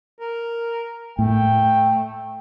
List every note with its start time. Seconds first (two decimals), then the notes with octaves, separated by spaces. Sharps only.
0.20 A#4
1.19 A2 A3 G5